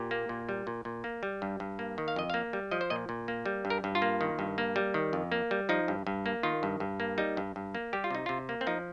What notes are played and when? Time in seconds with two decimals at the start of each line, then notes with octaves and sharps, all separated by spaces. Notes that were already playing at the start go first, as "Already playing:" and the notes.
Already playing: A#2 G4
0.11 A#3
0.29 A#2
0.49 G3
0.67 A#2
0.85 A#2
1.04 A#3
1.23 G3
1.42 G2
1.60 G2
1.79 A#3
1.98 D#3
2.08 F5
2.16 F2 D#5
2.30 A#3 F5
2.53 G3
2.71 F3 D#5
2.81 C5
2.90 A#2 D#5
3.09 A#2
3.28 A#3
3.46 G3
3.65 G2
3.70 A#4
3.84 G2
3.95 F4
4.02 A#3
4.21 D#3
4.39 G2
4.58 A#3
4.76 G3
4.94 D#3
5.13 F2
5.32 A#3
5.51 G3
5.69 F3 D#4
5.88 G2
6.07 G2
6.26 A#3
6.43 D#3 F4
6.63 G2
6.80 G2
7.00 A#3
7.18 G3 D#4
7.37 G2
7.56 G2
7.75 A#3
7.93 G3 G4
8.04 F4
8.11 C3 D#4
8.26 C3 F4
8.49 A#3
8.61 C4
8.67 F3 D#4